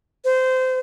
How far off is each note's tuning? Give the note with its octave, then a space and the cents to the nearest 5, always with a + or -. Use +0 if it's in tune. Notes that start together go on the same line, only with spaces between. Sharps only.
C5 -20